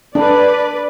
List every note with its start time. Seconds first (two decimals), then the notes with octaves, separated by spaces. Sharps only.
0.15 D4 B4 D5